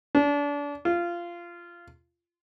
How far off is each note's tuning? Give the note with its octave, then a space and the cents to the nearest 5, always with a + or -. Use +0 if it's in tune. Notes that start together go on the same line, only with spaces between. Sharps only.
D4 -30
F4 -15